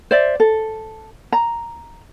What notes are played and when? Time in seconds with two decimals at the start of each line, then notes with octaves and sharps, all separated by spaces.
0.11 C5 D5 E5
0.40 A4
1.32 A#5